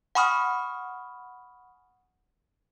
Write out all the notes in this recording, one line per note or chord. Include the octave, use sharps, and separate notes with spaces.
F#5 G#5 B5 C#6 D#6 F6